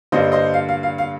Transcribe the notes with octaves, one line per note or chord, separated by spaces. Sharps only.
G2 D3 G3 A#3 C5 D#5
C5 D#5
F5
F5
F5
F5